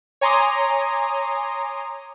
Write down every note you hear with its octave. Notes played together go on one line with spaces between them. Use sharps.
C#5 G#5 A#5 C6 D6 D#6